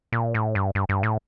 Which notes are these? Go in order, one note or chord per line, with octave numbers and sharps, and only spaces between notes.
A#2
A2
G2
G2
G2
A2